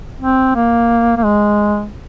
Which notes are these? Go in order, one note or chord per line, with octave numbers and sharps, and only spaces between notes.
C4
A#3
A#3
G#3